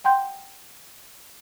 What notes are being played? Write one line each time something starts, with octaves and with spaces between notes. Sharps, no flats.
F#5 G5 C6 G6